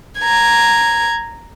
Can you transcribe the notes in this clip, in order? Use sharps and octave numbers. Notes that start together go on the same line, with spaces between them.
A#5 G#6